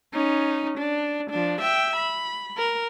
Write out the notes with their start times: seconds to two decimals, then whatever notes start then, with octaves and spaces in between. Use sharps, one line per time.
0.13 C#4 D#4
0.78 D4
1.30 F3 D4
1.61 E5 G5
1.96 B5
2.57 A#4